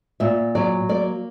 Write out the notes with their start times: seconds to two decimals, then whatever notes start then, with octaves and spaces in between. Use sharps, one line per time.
0.20 A#2 E5
0.55 F#3 D5
0.89 A#3 D5